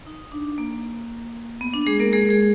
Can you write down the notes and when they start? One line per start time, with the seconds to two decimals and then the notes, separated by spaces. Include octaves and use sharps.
0.07 D#4
0.32 D4
0.58 A#3
1.61 B3
1.74 D4
1.87 G#3 G#4
2.00 A#3 A#4
2.13 G#3 G#4
2.29 G#3 G#4